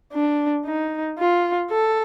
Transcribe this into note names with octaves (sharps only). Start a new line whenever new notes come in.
D4
D#4
F4
A4